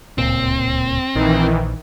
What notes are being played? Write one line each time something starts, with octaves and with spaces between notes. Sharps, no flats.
D1 C#2 A#2 C4
A#1 D#3 E3